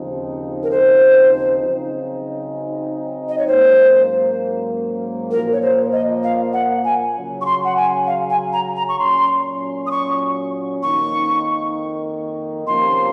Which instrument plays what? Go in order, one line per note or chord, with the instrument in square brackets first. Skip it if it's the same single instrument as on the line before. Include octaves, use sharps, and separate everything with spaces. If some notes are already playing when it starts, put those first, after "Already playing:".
Already playing: [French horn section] D#2 C#3 F3 C4 D#4
[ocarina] A#4
C5
[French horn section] C#3 F#3 C4 D#4
[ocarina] D#5
C#5
[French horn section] G#2 F#3 A#3 C#4 [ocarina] C5
[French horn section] A#2 F3 A#3 [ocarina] A#4
[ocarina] C#5
C5
D#5
F5
F#5
G#5
[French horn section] C#3 F#3 C#4
[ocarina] C#6
C6
F#5
G#5
F5
G#5
A#5
A#5
C#6
[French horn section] A#2 F#3 C#4 [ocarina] C6
[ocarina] D#6
C#6
[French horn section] F2 D#3 A#3 D#4 [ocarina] C#6
[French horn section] C3 F3 A#3 C#4 [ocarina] C6